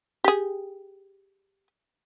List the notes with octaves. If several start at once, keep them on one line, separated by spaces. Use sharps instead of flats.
G4 G#4